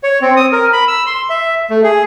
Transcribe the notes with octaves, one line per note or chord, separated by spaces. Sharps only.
C#5
C4
D#6
A#4
B5
E6
C6
E5
A3
G#4